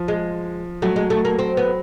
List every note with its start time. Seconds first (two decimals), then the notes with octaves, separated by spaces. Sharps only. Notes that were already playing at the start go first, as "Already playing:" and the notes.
Already playing: F3
0.08 G#3
0.82 F#3 A3
0.96 G#3
1.10 A3
1.25 A#3
1.39 C4
1.57 B3